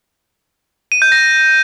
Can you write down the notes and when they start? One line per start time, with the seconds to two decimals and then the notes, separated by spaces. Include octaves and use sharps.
0.92 D#7
1.02 G6
1.12 A#6